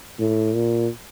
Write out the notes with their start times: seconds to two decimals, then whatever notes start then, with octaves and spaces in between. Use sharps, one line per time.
0.19 A2
0.55 A#2